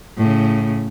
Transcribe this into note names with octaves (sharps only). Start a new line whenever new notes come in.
A2 C#3